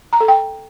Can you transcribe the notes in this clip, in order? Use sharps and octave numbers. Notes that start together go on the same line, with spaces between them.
A#5
A4
G5